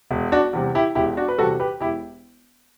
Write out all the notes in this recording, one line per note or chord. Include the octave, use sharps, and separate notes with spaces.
E1
D4 F#4
E2 C3 G3
E4 G4
E1 E4 G4
D4 F#4
B4
E2 C3 G3 F#4 A4
G4 B4
E1 E4 G4